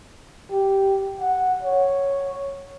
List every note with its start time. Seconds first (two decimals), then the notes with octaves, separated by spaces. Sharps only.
0.51 G4
1.21 F#5
1.63 C#5